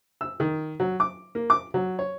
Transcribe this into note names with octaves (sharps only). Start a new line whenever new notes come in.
E6
D#3
F#3
D6
A#3
D6
F#3
C#5